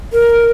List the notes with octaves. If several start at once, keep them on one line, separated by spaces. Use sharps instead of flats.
A#4